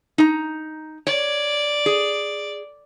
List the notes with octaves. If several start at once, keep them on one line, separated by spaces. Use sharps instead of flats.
D#4 A#5
C#5 D5
G#4